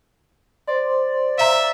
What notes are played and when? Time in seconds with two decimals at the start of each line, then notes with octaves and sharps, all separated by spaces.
0.68 C5 D5 C6
1.38 E5 F5 A#5